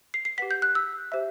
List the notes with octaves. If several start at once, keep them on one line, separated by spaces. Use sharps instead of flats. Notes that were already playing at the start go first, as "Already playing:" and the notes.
C7
C7
G4 B4 F#5 B6
G6
F#6
E6
G4 C5 E5